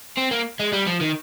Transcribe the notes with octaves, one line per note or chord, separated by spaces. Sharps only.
C4
A#3
G#3
G3
F3
D#3